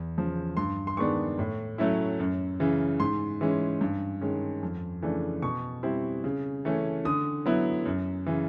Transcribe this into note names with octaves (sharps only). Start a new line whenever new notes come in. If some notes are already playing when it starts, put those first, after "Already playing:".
Already playing: E2
C#3 F3
G2 C6
C6
D#3 G#3 B3 D4 C#6
A2
F#3 A3 C#4 E4
F#2
C#3 E3
G#2 C6
E3 G#3 C#4
G2
D#3 G#3 C#4
F2
C#3 E3 A3 D4
B2 C#6
G3 C4 E4
C#3
E3 A3 C#4
D3 D#6
F#3 B3 E4
F#2
C#3 E3